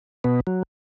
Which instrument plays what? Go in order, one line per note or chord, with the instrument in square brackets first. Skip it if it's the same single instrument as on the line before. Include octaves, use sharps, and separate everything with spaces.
[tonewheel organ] B2 B3
F#3